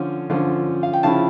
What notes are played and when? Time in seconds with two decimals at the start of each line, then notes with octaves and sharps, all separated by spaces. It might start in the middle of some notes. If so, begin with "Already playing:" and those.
Already playing: D3 F3 C#4 F4
0.30 D3 F3 C#4 F4
0.83 F5
0.93 G5
1.03 C#3 F3 C#4 E4 F5 A5